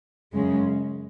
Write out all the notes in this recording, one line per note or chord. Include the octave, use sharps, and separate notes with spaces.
F#2 C#3 G#3 C#4